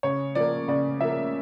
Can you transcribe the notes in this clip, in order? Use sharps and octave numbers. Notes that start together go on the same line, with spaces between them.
C#3 C#5
F3 A#3 D5
C#3 D5
F3 A#3 E5